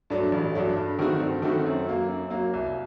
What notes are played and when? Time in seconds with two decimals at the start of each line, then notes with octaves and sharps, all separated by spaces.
0.10 G2 F#3 A3 D4
0.32 A1
0.55 G2 F#3 A3 D4
0.77 G2
0.99 D#3 A3 C4 F#4
1.20 G2
1.42 D#3 A3 C4 F#4
1.65 F#2
1.87 F#3 A#3
2.08 F#2
2.30 F#3 A#3
2.53 C2